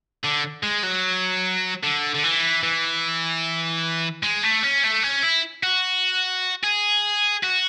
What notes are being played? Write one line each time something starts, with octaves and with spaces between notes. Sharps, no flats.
D3
G#3
F#3
D3
D3
E3
E3
G#3
A3
C#4
A3
C#4
E4
F#4
G#4
F#4